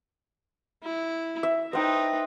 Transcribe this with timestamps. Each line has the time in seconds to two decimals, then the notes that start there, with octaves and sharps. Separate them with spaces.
0.84 E4
1.43 E5
1.73 D#4 B4 C5 G5